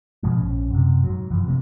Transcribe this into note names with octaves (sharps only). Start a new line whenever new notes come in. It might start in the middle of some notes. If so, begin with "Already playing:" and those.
G#2 B2 F3 G#3
A#1 C#4
F#2 C3
G#2 F#3
F1 F#2 E3 F3
C3 F3 A#3